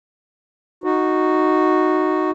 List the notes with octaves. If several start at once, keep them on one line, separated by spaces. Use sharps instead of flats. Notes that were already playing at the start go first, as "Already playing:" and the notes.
D#4 F#4